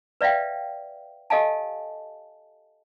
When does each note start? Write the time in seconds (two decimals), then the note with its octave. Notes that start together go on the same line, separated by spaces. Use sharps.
0.21 B4 D5 E5 F5 G5
1.30 G4 A4 D#5 F5 G#5 A5